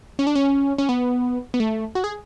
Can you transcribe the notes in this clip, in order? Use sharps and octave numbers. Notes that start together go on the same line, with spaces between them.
C#4
D4
C#4
C#4
B3
B3
A3
F#4
G#4